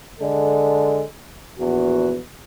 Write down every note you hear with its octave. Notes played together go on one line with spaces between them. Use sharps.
D3 G#3 A4
A#1 E2 B3 F#4